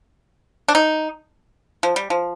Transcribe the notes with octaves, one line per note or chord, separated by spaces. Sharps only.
D4
D#4
F3
G3
F3